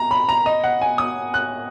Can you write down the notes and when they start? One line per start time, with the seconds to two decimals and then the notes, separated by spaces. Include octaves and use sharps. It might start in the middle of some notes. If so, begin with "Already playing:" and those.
Already playing: A#5
0.11 B5
0.29 A#5
0.46 D#5
0.64 F#5
0.81 G#5
0.98 D#6
1.34 F#6